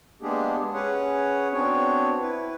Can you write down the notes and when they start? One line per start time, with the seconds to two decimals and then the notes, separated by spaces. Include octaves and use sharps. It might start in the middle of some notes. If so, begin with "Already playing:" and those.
0.22 G#3 A#3 B3 D4 G4 G#4
0.74 C#4 G#4 B4 C#5 F#5
1.52 B3 C4 D4 F#4 C#5
2.21 E4 B4